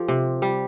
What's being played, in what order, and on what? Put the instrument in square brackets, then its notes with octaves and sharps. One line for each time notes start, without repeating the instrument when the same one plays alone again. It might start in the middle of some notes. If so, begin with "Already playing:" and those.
Already playing: [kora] F3 G4 A4
C3
G3